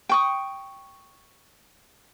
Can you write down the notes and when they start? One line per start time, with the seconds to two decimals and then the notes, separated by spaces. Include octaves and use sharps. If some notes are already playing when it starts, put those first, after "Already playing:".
0.09 G5 C#6 D#6